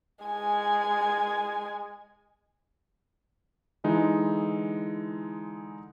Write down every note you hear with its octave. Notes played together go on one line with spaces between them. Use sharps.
G#3 G#5
D3 E3 G#3 D#4 E4